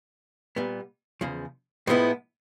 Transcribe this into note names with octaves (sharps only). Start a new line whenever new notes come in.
A#2 G3 B3
E2 C#3 F3
A2 F3 G#3 B3 E4